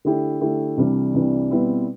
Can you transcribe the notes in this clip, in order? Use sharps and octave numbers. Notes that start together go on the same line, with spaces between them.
D3 A3 E4 G4
D3 A3 E4 G4
C2 C3 E3 G3 D4
C2 C3 E3 G3 D4
B2 G3 C4 E4 B4